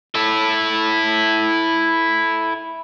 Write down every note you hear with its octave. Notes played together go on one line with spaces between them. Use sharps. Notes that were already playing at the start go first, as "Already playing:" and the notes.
E4 A4